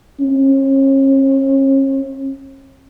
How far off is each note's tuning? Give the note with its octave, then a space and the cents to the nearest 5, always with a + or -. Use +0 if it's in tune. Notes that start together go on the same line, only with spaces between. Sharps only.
C#4 -40